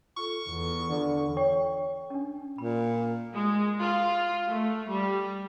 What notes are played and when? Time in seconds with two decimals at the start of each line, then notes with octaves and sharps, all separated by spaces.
0.17 F4 A4 C#6
0.49 E2
0.89 D3
1.37 C#5 G5 C#6
2.10 C#4 D4
2.58 A#2 B5
3.33 G#3
3.80 F4
4.48 A3
4.88 G3